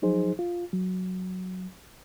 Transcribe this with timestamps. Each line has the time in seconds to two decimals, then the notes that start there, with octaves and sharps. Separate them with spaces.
0.02 F3 F#3 D#4 G#4 C5
0.39 F4
0.73 F#3